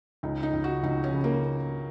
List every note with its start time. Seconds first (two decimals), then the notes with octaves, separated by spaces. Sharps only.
0.23 C#2 D#4
0.43 D#4
0.53 C#2
0.64 F#4
0.83 C#2 D#4
1.04 C#4
1.13 C#3
1.24 A#3